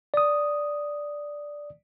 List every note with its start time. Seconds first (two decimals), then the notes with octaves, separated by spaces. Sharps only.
0.14 D5 D#6